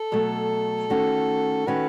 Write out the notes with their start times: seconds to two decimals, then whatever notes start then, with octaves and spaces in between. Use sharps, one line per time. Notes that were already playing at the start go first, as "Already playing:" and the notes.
Already playing: A4
0.12 B2 F#3 A3
0.90 D#3 A3 C#4 F#4
1.67 D#3 A3 C#4 F#4 B4